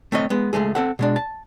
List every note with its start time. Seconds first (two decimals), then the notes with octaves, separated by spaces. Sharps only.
0.12 A3 C4 C#5 D#5
0.30 G#3 B3
0.53 C#2 G#3 A3 G#4
0.75 C4 A4 F#5
0.99 B2 G#3 D4
1.16 A5